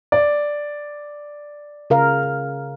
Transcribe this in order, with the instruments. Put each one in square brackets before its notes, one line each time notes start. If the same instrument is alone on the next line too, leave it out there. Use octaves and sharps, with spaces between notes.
[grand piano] D5
[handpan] C#3 A#4 F5